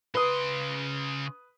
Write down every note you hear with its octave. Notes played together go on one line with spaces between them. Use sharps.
C#3 B4 C6 D#6